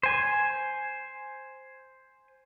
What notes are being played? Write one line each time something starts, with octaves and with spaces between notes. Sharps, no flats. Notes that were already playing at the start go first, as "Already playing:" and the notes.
C5 G#5